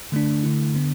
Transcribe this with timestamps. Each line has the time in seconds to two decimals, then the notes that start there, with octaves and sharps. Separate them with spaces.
0.12 D3 A3 D4
0.43 D3 A3 E4
0.74 D3 B3 D4